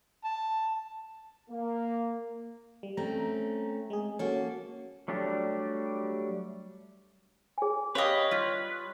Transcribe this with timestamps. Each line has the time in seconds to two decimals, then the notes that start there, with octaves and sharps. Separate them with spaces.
0.25 A5
1.50 A#3
2.83 G3
2.97 A3 C4 C#4 A#5
3.90 G#3 G#4
4.19 A#3 C#4 F#4 A4
5.08 F#3 G3 A3 D4 G4
7.58 G#4 G#5
7.95 G4 B4 C#5 D#5 F5 G5
8.31 G3 F4